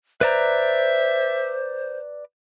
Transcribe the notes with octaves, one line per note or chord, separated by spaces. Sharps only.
B4 C5 D5 E5 A#5